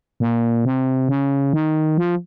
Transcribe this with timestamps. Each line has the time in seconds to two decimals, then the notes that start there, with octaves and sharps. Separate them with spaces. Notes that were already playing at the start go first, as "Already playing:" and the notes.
0.20 A#2
0.65 C3
1.09 C#3
1.53 D#3
1.98 F3